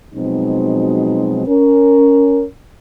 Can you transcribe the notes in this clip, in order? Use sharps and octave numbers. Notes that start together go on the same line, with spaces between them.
B2 F3 F#3 G#3 C4 D#4
C#4 A#4